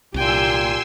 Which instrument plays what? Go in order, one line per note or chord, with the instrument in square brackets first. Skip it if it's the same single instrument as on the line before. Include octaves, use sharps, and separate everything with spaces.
[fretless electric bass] C2 [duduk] A#2 [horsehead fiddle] G4 G5 [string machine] G#5 C6 E6